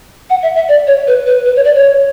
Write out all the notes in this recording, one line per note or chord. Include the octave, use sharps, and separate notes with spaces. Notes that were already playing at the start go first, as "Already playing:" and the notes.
F#5
E5
E5
D5
C#5
B4
B4
B4
C#5
D5
C#5